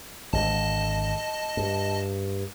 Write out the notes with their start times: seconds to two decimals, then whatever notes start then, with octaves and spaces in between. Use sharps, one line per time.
0.33 G#1 D3 D#5 A5
1.57 G2